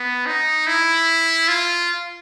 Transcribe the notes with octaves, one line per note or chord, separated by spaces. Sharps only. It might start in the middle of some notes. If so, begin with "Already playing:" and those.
Already playing: B3
D#4
E4
F4